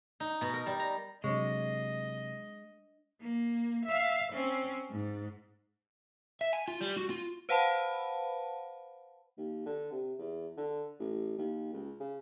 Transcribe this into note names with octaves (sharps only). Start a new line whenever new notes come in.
D#4
B2
A#4
G3
A#5
C3 F#3 G#3 D4 C#5 D#5 C#6
A#3
E5 F5
C4 C#4
G#2
E5
G#5
F4
G3
F#4
F4
B4 C5 F5 F#5 A5 B5
D#2
D3
C3
E2
D3
A1
D#2
C#2
C#3